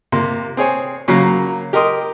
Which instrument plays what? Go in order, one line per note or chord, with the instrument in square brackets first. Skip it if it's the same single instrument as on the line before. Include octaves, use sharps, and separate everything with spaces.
[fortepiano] C3 A#3 C6
C4 G#4 C#5 G#5
C#3 F#3 A#3 A#4 A#5
G4 A#4 D#5 C6 D#6